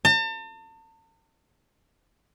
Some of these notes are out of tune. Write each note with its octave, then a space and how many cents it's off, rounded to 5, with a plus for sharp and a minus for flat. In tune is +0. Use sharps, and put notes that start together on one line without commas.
A5 +40